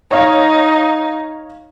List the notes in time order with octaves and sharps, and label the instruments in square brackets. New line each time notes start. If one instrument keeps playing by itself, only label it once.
[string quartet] D#4 [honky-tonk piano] C#5 D#5 F5